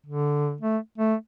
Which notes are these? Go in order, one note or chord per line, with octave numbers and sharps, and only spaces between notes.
D3
A3
A3